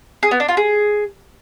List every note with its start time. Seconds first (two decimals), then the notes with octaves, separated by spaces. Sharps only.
0.23 G#4
0.31 B3
0.40 D4
0.49 F4
0.57 G#4